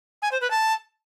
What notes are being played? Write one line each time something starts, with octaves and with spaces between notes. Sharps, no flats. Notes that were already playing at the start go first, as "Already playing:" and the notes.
G#5
C5
B4
A5